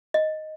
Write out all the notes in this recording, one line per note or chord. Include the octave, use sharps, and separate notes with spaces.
D#5